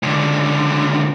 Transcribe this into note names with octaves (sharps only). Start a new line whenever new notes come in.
C#2 D3